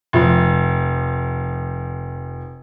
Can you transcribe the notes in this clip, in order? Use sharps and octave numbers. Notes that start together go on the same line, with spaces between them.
F1 F3